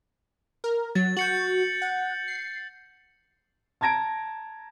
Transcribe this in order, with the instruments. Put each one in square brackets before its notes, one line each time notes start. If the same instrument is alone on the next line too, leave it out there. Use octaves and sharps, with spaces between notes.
[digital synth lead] A#4
[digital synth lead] F#3 [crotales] A6
[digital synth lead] F#4 [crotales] G6 C#7 F#7
[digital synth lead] F#5
C7
[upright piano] A5 A#5 G#6 A#6 D7